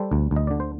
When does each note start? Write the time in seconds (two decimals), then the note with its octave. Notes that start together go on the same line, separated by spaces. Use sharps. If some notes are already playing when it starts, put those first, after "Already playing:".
Already playing: G3 A4 C5
0.11 D2
0.31 D2
0.36 D#5
0.47 D3 D5
0.60 C5